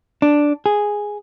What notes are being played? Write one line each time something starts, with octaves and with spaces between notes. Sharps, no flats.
D4
G#4